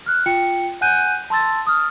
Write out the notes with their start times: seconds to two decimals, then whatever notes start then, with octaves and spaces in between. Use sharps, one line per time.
0.06 F6 F#6
0.26 F4 G5 C#7
0.81 F#5 G#5 F#6 G6 D#7
1.30 A5 C6 E6 A6
1.67 D#6 F6